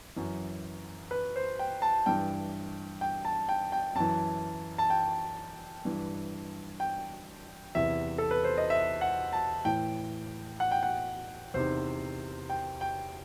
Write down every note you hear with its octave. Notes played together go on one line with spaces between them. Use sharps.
F#2 E3
B4
C5
G5
A5
G2 E3 G5
G5
A5
G5
G5
F#2 E3 A5
A5
G5
G2 E3
G5
E2 C3 E3 E5
A4
B4
C5
D#5
E5
F#5
A5
A2 E3 G5
F#5
G5
F#5
E2 C3 D#3 C5
G5
G5